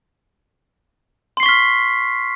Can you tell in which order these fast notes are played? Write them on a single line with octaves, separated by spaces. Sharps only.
C6 C7 C#6 B6 F6